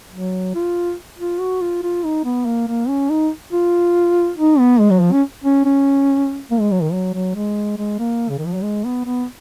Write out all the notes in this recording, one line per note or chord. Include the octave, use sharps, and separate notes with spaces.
F#3
F4
F4
F#4
F4
F4
D#4
B3
A#3
A#3
C#4
D#4
F4
D#4
B3
G#3
F#3
F3
C#4
C#4
C#4
A#3
G#3
F#3
D#3
F#3
F#3
G#3
G#3
A#3
C#3
D#3
F3
F#3
G#3
B3
B3